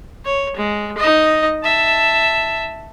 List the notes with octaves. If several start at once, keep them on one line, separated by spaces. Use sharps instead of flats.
C#5
G#3
D#4 D#5
E5 A5